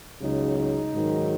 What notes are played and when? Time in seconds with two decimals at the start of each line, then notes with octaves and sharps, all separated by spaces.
0.21 C#2 C#3 F#3 D#4
0.58 D#4
0.94 G#2 D#3 F#3